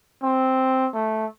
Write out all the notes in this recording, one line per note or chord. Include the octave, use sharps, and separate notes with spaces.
C4
A3